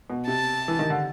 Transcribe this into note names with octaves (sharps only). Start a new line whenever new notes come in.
B2
C3 A5
E3
D#3
D3